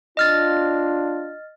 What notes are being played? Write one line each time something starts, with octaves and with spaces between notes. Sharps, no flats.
D4 F4 D#5 F6 A6